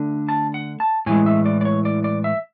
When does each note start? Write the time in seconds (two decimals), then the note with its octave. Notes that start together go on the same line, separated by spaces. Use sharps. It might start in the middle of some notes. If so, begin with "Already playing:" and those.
Already playing: D3 A3 D4
0.29 A5
0.54 F#5
0.80 A5
1.06 A2 E3 G#3 G#5
1.26 E5
1.46 D5
1.61 D5
1.65 C#5
1.85 D5
2.04 D5
2.24 E5